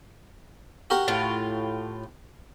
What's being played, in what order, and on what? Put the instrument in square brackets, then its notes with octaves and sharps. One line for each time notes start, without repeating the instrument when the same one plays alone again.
[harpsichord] F#4 G4 A#4
[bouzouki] A2 F4